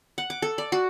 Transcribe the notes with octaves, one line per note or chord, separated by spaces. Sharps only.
F#5
D6
A4
D5
F#4